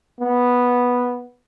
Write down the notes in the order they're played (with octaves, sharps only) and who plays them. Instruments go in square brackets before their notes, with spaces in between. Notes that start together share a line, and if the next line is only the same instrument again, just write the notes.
[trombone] B3